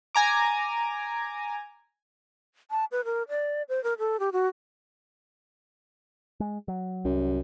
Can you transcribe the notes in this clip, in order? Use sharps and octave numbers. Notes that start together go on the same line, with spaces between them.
G#5 A#5 D6
A5
B4
A#4
D5
C5
A#4
A4
G4
F#4
G#3
F#3
C2 F#2